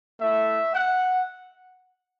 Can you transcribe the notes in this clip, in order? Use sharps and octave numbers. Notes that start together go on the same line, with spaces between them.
A3 E4 E5
F#5